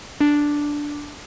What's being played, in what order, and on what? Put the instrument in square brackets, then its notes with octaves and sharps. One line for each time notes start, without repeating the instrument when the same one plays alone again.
[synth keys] D4